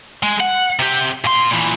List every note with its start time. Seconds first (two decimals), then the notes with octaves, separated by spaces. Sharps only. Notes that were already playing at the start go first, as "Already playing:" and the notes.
0.23 G#3
0.40 F#5
0.79 C3 G4
1.25 A#2 C6
1.51 A#2 E3